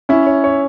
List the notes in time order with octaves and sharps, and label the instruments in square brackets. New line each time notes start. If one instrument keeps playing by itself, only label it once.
[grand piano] C#4 [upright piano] E4
[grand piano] C#5
C#5